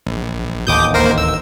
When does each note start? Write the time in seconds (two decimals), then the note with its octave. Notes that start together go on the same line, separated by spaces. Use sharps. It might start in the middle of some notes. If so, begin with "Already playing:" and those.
0.06 A#1
0.67 D1 A1 D#2 D6 D#6 G6
0.94 A#3 A#4 C5
1.18 E6